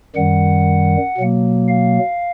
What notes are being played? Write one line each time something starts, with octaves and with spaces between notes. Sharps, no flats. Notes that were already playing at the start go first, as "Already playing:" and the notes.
F#2 D#3 G3 F#5
B2 F#3 A#3
F5